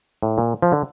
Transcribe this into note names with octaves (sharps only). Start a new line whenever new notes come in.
A2
A#2
F3
D3